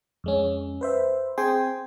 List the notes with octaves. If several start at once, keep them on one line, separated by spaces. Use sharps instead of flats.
F2 G#3 C#4
B4 C5 E5
C4 G#4 G5 G#5 C6